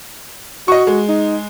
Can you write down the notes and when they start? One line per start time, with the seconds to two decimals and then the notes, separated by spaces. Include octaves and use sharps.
0.68 F#4 D#5 C#6
0.87 G#3
1.09 D#4